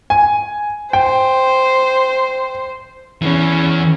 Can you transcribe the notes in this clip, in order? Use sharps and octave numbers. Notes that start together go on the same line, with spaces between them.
G#5
C5 G5
E3 C#4 G#4